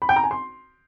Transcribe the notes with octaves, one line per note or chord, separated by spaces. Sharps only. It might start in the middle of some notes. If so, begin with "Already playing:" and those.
B5
G5
A#5
G#5
C6